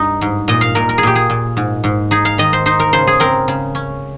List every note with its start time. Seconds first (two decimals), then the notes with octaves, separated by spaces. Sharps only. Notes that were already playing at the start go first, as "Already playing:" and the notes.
Already playing: G2 D#4
0.21 G#2
0.48 A#2 D#5
0.61 F5
0.75 A#2 A#4
0.89 A#4
0.98 G#4
1.03 A#2 G4
1.16 G#4
1.30 A#2
1.57 G#2
1.84 G#2
2.11 D#4 G#4
2.25 F5
2.38 D#3 D#5
2.53 C5
2.66 D#4 C5
2.80 A#4
2.93 C#3 C5
3.07 G#4
3.20 C4 A#4
3.48 C#3
3.75 C#4